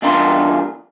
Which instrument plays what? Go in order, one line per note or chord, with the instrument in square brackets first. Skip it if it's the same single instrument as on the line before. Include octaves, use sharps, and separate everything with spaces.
[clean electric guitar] E2 G2 D4 F4 A#4 C6